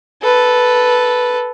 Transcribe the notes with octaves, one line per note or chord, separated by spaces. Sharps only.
A4 B4